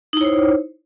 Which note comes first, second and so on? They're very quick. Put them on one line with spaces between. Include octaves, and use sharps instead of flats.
D#4 E4 C#5 C5